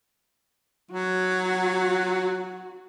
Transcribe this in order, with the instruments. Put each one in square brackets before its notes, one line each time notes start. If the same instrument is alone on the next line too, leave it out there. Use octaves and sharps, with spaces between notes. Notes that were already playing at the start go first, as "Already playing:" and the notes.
[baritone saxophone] F#3 [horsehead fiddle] F#4